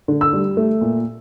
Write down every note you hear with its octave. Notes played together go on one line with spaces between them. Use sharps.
D3
E6
G3
A3
A#2